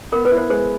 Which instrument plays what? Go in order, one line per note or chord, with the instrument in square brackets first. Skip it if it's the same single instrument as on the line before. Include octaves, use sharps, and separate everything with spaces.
[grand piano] B3 [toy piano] A#4
[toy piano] B4
[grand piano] E4
[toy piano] C5
[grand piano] G#3 [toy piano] C5